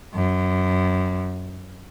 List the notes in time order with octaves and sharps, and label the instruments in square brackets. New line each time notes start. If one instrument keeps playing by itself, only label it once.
[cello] F#2